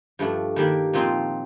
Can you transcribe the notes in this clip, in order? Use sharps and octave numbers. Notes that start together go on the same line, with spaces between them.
G2 F3 A3 D4
D#3 G3 A#3 D4
A#2 F3 C4 D#4